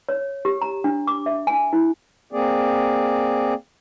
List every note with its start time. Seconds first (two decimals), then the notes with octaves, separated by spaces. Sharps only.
0.09 C#5
0.45 G4
0.61 A#5
0.84 D4
1.07 D6
1.26 E5
1.47 G#5
1.73 E4
2.33 A#3 C4 G#4 D5